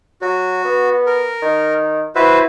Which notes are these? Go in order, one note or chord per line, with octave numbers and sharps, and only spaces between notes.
F#3 F#4
B3
A#4
D#3
E4 F#4 B4 C5